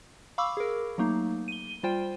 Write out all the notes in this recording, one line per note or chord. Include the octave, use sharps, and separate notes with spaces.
F5 B5 C#6 D6 E6
G#4 A#4
F#3 A3 A#3 D#4
D#7 G7
G3 F4 C5 G5